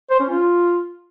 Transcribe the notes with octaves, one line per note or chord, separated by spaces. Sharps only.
C5
C#4
F4